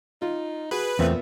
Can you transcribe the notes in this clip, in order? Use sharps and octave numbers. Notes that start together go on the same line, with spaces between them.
D#4 F4
F#4 G#4 B4
E2 A#2 A3 B3 C4 E5